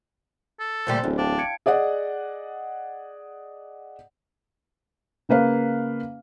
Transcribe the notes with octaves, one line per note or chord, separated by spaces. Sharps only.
A4
D2 A#2 G3 C5
D1 E2
D4 F5 G5 A5
G#6 C#7 D7
G#4 D5 D#5 F#5
C#3 A#3 B4 F5